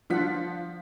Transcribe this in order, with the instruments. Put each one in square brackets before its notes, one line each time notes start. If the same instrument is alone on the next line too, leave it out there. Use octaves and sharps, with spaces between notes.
[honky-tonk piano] F3 B6 [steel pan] D4 F4 F#5